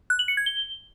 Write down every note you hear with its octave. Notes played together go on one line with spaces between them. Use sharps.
F#6
F#7
C#7
G#6
G7